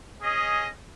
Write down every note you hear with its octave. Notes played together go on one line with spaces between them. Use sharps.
C#4 G#4 D#5